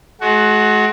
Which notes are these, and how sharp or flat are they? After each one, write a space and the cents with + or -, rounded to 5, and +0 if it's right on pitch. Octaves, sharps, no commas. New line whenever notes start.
G#3 +40 F#4 +5